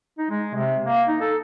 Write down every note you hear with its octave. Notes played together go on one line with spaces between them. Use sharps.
D#4
G#3
C3
A#3
D#4
A4